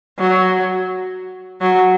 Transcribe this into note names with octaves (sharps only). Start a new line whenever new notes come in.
F#3
F#3